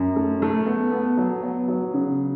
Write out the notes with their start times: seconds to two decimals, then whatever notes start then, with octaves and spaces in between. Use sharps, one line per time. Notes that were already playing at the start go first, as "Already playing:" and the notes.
Already playing: F#2
0.16 A3
0.42 A3
0.66 B3
0.92 B3
1.17 F#3
1.43 B3
1.68 F#3
1.94 C#3